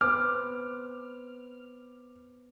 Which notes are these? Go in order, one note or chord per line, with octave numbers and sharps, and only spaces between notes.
B3 B4 C5 D6 F6